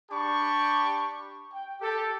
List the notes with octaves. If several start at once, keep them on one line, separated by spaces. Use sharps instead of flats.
D4 G4 A5 B5 C#6
G5
G4 A4